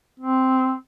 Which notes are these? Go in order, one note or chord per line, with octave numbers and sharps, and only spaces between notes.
C4